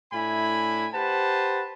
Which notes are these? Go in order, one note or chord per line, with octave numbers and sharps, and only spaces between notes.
A2 D4 E4 G#5 B5
G4 B4 C5 F#5 A5